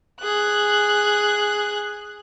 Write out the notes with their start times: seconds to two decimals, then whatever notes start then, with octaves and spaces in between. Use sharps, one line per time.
0.22 G#4 F#6